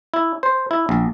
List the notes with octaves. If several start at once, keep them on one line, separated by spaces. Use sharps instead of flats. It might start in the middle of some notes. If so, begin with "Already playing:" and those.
E4
C5
E4
A#1